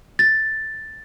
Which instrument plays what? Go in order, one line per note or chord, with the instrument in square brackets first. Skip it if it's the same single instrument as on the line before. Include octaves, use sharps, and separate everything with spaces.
[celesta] A6